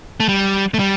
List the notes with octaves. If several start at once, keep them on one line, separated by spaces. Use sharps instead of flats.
A3
G3
A3
G3